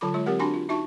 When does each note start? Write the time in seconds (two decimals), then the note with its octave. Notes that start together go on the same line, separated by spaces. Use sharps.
0.01 D3 F#3 F4 A4 B5 D6
0.14 G#3 F4 C#5
0.26 F#3 C4 G4 A#4 F#5
0.39 D4 F#4 G#5 B5 C6
0.54 F4
0.69 D#4 F#4 E5 A5 C#6